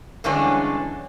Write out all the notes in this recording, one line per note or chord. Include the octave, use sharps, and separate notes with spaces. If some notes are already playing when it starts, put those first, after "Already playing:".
G2 D3 E3 G#3 C#4 D4